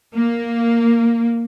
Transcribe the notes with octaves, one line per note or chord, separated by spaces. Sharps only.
A#3